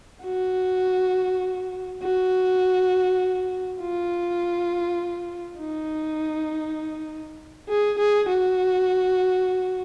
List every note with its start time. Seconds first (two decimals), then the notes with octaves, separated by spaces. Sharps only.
0.24 F#4
2.03 F#4
3.81 F4
5.60 D#4
7.69 G#4
7.99 G#4
8.29 F#4